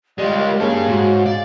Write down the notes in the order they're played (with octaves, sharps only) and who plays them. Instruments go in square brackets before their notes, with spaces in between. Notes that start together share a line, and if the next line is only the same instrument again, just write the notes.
[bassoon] G3 [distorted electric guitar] G#3 F4 [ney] D#5
[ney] A#4
[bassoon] C#3 [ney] A#3 [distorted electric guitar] G4 A5
[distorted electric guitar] G#2 [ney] F#4
[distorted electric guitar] D5 [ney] F5